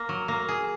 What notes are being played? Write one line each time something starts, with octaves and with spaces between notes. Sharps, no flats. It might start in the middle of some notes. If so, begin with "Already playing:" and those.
Already playing: A#3
F#3
A#3
G#4